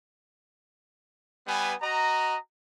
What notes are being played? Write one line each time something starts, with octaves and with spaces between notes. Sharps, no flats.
G3 B3 B4 G#5
F#4 D#5 A#5